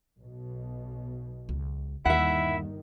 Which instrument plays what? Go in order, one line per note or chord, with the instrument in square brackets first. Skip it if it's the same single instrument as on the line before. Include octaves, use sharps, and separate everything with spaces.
[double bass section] B1 B2
[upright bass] C#2
[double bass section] G1 D#3 G3 [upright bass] D#2 [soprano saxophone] E4 [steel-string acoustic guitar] E5 F#5